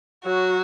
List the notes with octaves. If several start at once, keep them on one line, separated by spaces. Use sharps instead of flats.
F#3 F#4